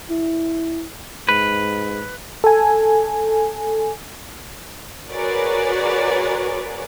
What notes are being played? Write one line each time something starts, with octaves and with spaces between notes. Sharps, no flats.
E4
G#2 B4
A4 G#5
F#4 G#4 A#4 B4 C#5 D5